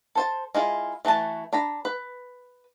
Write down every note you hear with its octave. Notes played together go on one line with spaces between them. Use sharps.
A4 C5 A5
G#3 E4 F4
E3 A3 F#4 A5
D4 A#5 B5
B4